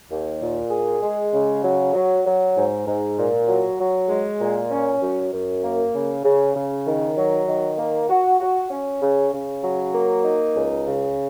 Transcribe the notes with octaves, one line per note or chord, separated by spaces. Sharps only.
D#2
A#2
G#4
G#3
C#3
F#3
F#3
F#3
G#2
G#2
A#2
F#3
F#3
G#3
A#2
C#4
F#2
F#2
A#3
C#3
C#3
C#3
D#3
F#3
D#3
A#3
F#4
F#4
C#4
C#3
C#3
F#3
A#3
D#4
C#2
C#3